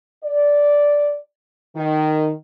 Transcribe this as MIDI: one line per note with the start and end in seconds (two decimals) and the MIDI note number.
0.24 1.18 74
1.76 2.31 51